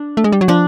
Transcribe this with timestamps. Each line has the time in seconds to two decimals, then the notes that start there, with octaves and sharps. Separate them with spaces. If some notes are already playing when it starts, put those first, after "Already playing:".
Already playing: D4
0.17 A3
0.24 G#3
0.32 G3
0.41 F#3
0.48 F3 D4